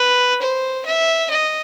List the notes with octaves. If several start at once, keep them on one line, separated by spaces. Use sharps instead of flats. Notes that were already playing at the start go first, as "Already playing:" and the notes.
Already playing: B4
C5
E5
D#5